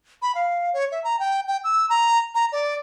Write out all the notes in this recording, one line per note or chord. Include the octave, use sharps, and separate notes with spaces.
B5
F5
C#5
E5
A#5
G5
G5
E6
A#5
A#5
D5